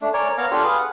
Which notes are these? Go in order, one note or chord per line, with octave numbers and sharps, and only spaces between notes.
A3 D4
A#4 C#5 D5 G#5
B3 C#5 F5 A#5
D4 F4 G4 A4
G#4 B4 F5
F#5